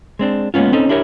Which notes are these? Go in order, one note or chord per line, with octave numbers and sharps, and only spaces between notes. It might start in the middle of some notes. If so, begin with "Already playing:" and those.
G#3 C4 D4
G#3 A#3 B3 C#4 F4
C4 C#4 D#4 A4
D4 E4 G4 A#4 C#5